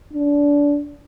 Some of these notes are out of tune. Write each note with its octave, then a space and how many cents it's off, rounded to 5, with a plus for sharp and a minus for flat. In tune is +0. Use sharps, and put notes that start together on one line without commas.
D4 -25